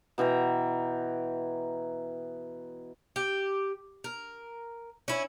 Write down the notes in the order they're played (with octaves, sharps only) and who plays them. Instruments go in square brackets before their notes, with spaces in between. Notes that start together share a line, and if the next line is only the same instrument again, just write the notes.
[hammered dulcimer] B2 E3 G5 A#5
[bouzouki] G4
A#4
C#4 E4